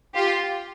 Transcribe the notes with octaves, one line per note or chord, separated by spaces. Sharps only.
F4 G4